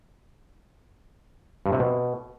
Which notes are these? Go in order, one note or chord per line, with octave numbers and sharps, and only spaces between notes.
G2
C3
B2